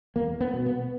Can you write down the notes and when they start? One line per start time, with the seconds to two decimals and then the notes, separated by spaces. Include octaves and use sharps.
0.16 E2 A#3
0.41 B3
0.54 B2
0.66 B3